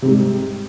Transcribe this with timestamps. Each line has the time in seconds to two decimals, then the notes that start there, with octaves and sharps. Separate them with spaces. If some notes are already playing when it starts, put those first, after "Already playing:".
0.02 C3
0.05 G#2
0.08 G3